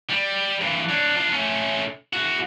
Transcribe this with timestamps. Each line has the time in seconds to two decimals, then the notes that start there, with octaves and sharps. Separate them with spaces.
0.10 G3
0.61 G2 E3
0.90 D4 C#5
1.16 D4 F4
1.33 A3 C#4
2.13 E2 F#4